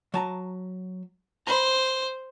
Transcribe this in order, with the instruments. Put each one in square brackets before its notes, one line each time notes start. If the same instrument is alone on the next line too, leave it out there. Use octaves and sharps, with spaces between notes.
[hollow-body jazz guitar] F#3 A5 A#5
[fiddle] C5 [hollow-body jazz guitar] A#5 B5